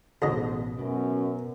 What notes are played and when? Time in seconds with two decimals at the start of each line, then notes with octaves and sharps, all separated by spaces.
0.22 A1 D2 G#2 B2 D#5
0.79 F#2 B2